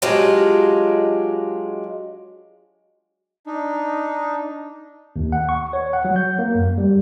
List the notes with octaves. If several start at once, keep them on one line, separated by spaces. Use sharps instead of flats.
F#3 G#3 D4 F4 G4
D4 D#4
D#2
F#5
C#6
C#5
F#5
F#3
G6
A#3
F#2
G3